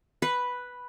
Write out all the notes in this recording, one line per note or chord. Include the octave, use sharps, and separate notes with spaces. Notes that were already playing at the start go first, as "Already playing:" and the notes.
B4